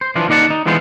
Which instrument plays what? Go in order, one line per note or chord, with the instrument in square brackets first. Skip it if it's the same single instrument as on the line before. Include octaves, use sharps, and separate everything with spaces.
[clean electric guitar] C5
E3 F3 D4 F4
D#2 D#4 D5 F#5 A5
D#4
D3 E3 G#3 B3 F4 C5